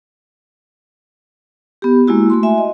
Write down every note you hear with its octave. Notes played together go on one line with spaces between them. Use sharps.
B3 G4
G#3 A#3 E4 F#4
A3 F#4 C6
F#4 E5 G#5
D#5